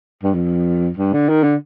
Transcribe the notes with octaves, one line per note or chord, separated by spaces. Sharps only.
G2
F2
G2
D3
D#3
D3